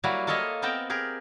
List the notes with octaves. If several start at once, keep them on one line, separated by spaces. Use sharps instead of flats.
F#3 G3 A#3 E4 F#4
A#3 F4 A4 C#5 D#5 E5
B3 C4 A#4 G5 A5 A#5
G4 G#4 A#4